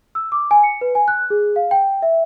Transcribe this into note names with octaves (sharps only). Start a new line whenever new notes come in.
E6
D6
G#5
C#7
B4
G#5
F#6
G#4
F5
G5
E5